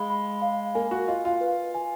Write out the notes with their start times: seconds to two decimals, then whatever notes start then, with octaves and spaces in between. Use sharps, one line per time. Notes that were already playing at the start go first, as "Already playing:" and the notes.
Already playing: G#3 F5 B5
0.10 B5
0.42 F5
0.75 A#3 G#5
0.91 F#4
1.08 F4 D#5
1.25 F4
1.41 B4
1.74 G#5